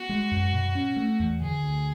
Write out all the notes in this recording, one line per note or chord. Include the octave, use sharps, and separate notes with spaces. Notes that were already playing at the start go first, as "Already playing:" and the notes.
Already playing: B3 F#4
G#3
F#2
B2
C#4
A3
E2
D3 G#4
D2